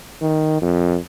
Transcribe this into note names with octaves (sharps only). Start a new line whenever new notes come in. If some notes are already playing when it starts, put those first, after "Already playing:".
D#3
F2